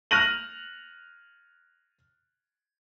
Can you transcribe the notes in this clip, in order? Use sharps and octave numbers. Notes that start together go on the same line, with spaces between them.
F6 F#6 A#6 D#7 F#7